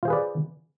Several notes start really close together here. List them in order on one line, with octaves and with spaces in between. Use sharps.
F4 C5 G#4 B4 D5